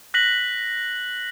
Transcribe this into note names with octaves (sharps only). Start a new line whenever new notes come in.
F#6 A#6 B6 F#7